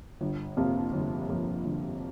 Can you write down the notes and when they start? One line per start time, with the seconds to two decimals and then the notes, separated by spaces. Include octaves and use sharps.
0.21 G1
0.57 F2 C3 F3 A#3
0.93 G1
1.29 F2 C3 F3 A#3
1.65 G1